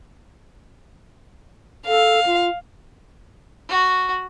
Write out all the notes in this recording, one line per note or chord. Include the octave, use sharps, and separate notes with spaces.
A4 F5
F4
F#4